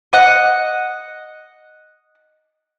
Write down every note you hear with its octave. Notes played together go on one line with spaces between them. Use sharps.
D#5 F#5